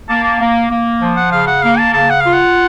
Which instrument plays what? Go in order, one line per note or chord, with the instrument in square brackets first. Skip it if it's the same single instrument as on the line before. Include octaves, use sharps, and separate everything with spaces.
[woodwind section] A#3 [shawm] A5
[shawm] A5
[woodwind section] A#3
A#3
F3
[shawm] F#5
[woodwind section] C#3 [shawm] F5
[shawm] F#5
[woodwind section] A#3 [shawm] F5
[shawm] A5
[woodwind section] C#3 [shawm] A5
[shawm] F#5
[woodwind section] F4 [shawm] F5
[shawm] F#5